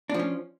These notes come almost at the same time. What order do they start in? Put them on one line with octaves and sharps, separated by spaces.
D4 F3 C#4